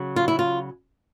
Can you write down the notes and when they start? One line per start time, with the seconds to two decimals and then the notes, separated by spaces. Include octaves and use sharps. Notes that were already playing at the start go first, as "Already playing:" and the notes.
Already playing: C#3 F#3
0.16 F4
0.28 E4
0.39 F4